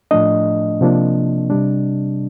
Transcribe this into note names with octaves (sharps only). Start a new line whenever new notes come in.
A2 F3 A3 D4 D#5
C3 F3 A#3 D4
C3 G3 D4